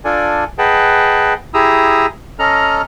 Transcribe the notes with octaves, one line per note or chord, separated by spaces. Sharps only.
D4 F4 A4 D5 G#5
G#4 B4 D#5 F#5 G5 A5
E4 G4 G#4 A#5 D#6 E6
C#4 A4 D#5 A#5 F6